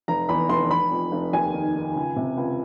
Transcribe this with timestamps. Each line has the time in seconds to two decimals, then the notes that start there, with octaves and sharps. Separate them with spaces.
0.08 F1 A#5
0.29 E2 B5
0.49 F1 C6
0.71 F1 B5
0.91 F2
1.12 F1
1.33 D#2 G#5
1.54 D#3
1.75 D#3
1.96 C#2
2.16 C3
2.37 C#2